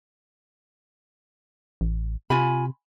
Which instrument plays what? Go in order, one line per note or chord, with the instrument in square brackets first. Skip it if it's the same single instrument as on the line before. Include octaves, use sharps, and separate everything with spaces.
[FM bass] A1
[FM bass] C3 [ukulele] F4 G#5 B5